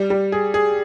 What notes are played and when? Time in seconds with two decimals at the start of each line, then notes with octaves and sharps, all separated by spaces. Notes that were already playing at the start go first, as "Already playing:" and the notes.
Already playing: G3
0.10 G3
0.32 G#4
0.54 G#4